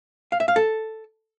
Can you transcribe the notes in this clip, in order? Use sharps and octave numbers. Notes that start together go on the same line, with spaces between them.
F5
E5
F5
A4